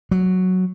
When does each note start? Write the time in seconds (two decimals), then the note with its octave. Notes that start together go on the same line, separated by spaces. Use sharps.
0.11 F#3